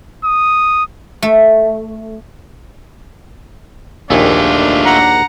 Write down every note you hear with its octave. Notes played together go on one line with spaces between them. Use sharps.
D#6
A3
A#1 D#2 A3 D4 F4 G#4
F#5 A#5